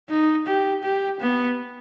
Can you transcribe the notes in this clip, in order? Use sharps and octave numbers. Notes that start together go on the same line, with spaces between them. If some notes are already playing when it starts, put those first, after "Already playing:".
D#4
G4
G4
B3